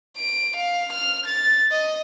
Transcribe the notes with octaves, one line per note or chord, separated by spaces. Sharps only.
D7
F5
F6
A6
D#5